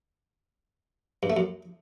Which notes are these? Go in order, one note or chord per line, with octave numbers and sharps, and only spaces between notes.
G2
A3
F#2